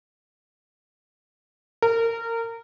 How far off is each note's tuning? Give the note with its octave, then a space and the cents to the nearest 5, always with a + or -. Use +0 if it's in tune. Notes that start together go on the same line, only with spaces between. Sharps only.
A#4 -25